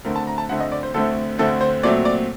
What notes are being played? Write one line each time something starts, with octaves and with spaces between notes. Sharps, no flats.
D2 D3 A3 C4 A#4
A5
A#5
A5
D2 D3 A3 C4 F#5
D#5
D5
C5
D2 D3 A3 C4 A4
D2 D3 A3 C4 A4
C5
A#2 F#3 A3 C4 D5
D5